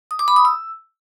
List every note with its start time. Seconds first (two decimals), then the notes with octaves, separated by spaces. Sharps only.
0.11 D#6
0.19 D6
0.28 B5
0.36 D#6
0.45 E6